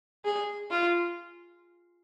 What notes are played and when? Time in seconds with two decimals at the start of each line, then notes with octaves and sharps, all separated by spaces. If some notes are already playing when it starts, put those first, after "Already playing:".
0.25 G#4
0.70 F4